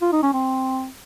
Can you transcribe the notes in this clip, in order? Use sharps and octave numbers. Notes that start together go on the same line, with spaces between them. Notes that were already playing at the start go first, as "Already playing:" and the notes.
F4
D#4
C#4
C4